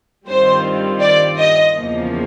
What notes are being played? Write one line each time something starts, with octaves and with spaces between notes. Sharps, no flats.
G2 D#3 G3 C4 F4 C5
D5
D#5
E2 C#3 F3 A#3